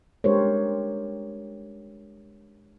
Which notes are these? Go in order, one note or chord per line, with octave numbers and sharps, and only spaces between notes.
G#3 D4 G4 A#4 C5 C#5